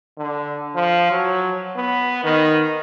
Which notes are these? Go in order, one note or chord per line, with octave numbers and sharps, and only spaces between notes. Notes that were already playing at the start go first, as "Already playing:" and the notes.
D3
F3
F#3
B3
D#3